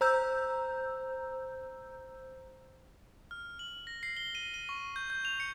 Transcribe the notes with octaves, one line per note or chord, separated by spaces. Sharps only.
C5 A#5 E6 G6
F6
F#7
A#6
C7
G7
D#7
D#7
C#6
G6
G6
F7
C#7